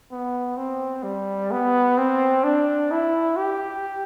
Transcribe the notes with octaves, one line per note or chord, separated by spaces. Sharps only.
B3
C4
G3
B3
C4
D4
E4
G4